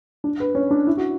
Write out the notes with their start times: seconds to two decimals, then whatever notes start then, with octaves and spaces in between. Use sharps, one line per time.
0.24 D4
0.40 B4
0.55 C#4
0.71 D4
0.87 E4
0.97 F#4